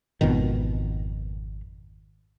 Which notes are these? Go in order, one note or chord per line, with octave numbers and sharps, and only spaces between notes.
G#1 F2 B2 D#3